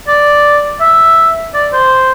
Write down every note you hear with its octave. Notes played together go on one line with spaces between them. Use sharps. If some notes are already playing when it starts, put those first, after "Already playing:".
D5
E5
D5
C5